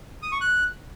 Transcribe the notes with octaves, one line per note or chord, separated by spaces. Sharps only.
D#6
C#6
F#6